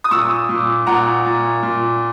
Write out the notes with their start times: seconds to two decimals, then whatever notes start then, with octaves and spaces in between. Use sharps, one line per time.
0.04 D#6
0.11 A#2 C#6 E6
0.49 A#2
0.86 A#2 F#5 A#5
1.26 A#2
1.63 A#2